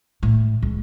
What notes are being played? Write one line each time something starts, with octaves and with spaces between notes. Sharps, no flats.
A2
C#2